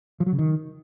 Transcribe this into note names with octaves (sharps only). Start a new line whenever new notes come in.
F3
F#3
C#3
D#3